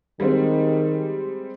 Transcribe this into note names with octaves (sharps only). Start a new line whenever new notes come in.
D#3 G3 G#3 C4